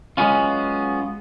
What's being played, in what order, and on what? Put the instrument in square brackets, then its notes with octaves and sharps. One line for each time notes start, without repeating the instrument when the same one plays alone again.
[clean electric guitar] F#3 G#3 B3 C#4 F4